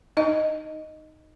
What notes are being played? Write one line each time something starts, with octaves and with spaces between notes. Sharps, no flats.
D#4 D#5